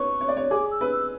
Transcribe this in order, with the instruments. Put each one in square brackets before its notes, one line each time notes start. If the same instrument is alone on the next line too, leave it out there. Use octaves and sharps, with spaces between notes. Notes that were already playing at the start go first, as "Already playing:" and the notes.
Already playing: [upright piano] B4 C#5 [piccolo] C#6
[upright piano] C#5
D5
C#5
[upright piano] G#4 [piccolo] D6
[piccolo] E6
[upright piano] B4
[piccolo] E6